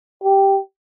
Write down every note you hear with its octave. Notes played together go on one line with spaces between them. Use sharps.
G4